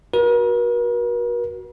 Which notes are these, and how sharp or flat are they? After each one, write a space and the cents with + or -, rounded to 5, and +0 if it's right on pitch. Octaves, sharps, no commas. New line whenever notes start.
F#4 +0 A#4 +45